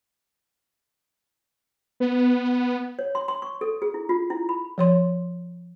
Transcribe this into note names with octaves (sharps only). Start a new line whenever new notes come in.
B3
C#5
C6
C6
C#6
A4
G#4
E4
F4
E4
B5
F3 C#5 C6